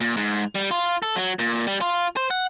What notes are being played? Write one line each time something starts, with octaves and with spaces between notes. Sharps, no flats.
A#2
G#2
G3
F4
A4
F#3
A#2
G3
F4
C5
F#5